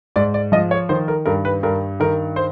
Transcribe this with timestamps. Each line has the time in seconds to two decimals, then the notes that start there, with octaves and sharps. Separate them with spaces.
0.16 G#2 D5
0.34 D5
0.52 F3 D#5
0.71 C#5
0.89 D#3 C5
1.08 A#4
1.26 G2 A#4
1.45 B4
1.63 G2 A#4
2.00 D#3 A#4
2.36 C5